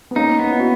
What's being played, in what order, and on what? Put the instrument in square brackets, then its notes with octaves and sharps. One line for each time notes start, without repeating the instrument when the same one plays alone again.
[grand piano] B3
[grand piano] A#3 C#4 [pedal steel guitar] D#4
[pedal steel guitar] B3
[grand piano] E4
F#4